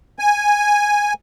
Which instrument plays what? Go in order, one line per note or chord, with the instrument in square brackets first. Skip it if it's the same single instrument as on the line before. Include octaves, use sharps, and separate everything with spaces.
[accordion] G#5